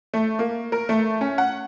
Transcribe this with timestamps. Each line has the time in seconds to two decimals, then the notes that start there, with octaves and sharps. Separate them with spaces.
0.14 A3
0.39 A#3
0.72 A#4
0.89 A3
1.21 C#4
1.38 F#5